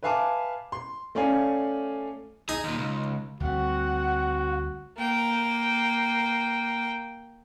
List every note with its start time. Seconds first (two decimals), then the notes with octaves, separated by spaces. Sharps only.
0.03 B4 E5 F5 G#5 A5 D6
0.72 C6
1.15 A3 C#4 D5 F5 G#5
2.49 D#4 G#4
2.64 D#2 A#2
2.78 C#2
3.40 D2 G3 C4 F#4 F#5
4.98 A#3 G5